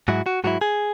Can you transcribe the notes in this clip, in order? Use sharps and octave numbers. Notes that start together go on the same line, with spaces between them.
G#2 F#3 E4 F#4
F#4
G#2 F#3 E4 F#4
G#4